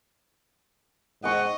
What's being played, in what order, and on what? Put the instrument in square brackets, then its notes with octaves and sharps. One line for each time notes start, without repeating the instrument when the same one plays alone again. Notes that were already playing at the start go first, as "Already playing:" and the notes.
[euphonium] G#2 [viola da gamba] D#5 [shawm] F#5 [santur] G5 C#6